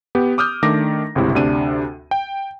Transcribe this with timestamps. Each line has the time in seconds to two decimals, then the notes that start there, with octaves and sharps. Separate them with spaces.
0.15 B3 G4
0.38 D6 D#6 F6 G6
0.63 D#3 A3 D4 D6 A#6
1.15 G1 C#2 C3 E4
1.35 D2 C3 D4 D#7
2.11 G5